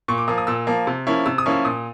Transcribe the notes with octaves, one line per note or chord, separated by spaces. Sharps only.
A#2 C#6
D6
F3 A#3 D#6
D#6
A#2 E6
F3 A#3
C3
F3 A#3 C#4 E4
C3 E6
D#6
F3 A#3 C#4 E4
E6
A#2 D#6